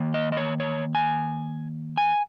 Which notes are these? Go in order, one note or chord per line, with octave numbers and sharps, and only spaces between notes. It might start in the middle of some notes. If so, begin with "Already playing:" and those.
Already playing: D#3 A#3
D#5
D#5
C#5
C#5
G#5
G#5